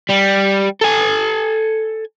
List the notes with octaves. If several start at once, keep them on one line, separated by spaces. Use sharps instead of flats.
G3
A4 G#5